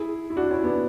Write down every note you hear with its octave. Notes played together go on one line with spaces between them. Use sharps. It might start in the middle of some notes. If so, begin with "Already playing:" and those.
Already playing: E4 G#4
E4
D4 F#4
C#4 E4
B3 D4